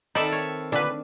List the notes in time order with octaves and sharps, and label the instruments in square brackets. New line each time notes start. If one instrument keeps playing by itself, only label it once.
[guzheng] D#3 C4 B5 [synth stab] D#4 E6 [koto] A4 D5 E5
[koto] C#5
[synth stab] A#2 D3 B4 [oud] D4